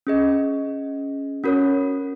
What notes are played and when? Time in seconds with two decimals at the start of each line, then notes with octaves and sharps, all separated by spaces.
0.07 C#4 G#4 D#5
1.44 C#4 F#4 A#4 C#5